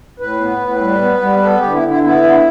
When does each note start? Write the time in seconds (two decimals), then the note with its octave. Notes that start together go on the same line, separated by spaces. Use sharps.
0.20 A2 B4
0.41 B3
0.61 A2
0.81 G3
1.01 B3
1.22 G3
1.42 B3 A4
1.57 G4
1.63 D3
1.72 E4
1.83 D3
1.88 E4
2.03 B3 E4
2.23 D3